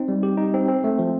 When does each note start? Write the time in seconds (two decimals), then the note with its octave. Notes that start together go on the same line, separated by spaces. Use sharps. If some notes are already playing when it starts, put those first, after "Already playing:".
Already playing: C4 D#4
0.08 G3
0.23 G4
0.37 D#4
0.54 C4
0.69 C4
0.84 A3
0.99 F3